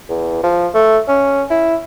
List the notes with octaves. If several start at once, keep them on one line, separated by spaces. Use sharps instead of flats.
E2
F3
A3
C#4
E4